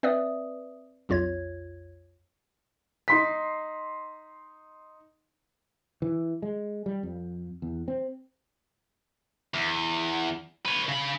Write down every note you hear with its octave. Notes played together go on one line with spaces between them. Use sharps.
C4 B4 D5 E5 D#6
B1 F2 F4 C#5 G#6
D#4 C6 B6
E3
G#3
G3
F2
E2
C4
E2
B4 C#5
C#3 B5